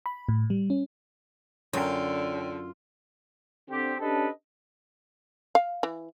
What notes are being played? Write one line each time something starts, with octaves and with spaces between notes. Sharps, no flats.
B5
A2
G3
C#4
F#2 D3 F4 C#5 G5
D3 C4 G4
C#4 D4 G4 A4 B4 D#5
F5
E3